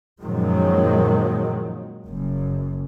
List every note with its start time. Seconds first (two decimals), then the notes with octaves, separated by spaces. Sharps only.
0.22 F#2 A#2 D#3 F3 F#3 G#3
2.06 F#1 F#2